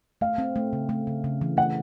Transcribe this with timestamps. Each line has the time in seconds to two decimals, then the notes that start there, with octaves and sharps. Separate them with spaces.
0.21 A3 F5
0.38 C4
0.56 A3
0.73 C#3
0.89 A3
1.07 C#3
1.24 C#3
1.41 E3
1.57 A3 F#5